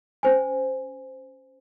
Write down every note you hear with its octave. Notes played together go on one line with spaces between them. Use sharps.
C#4 C5 G#5